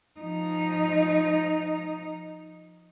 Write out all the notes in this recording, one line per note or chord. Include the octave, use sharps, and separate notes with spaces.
F3 D#4